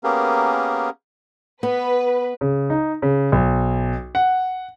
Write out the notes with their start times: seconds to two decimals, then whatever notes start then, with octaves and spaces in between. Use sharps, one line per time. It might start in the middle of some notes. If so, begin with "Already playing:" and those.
0.04 A#3 B3 C#4 G4 G#4 A#4
1.63 B3 B4
2.41 C#3
2.70 D#4
3.02 C#3
3.32 B1
4.15 F#5